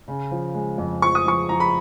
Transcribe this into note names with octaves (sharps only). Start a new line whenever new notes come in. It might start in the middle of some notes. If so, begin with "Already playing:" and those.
C#3
F3
G#3
F2
F3 C#6
D#6
F3 C#6
F3 A#5
B5